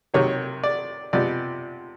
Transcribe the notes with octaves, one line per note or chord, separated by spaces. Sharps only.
C3 D#3 F#3 C#5
D5
C3 F3 G#3 B3 D5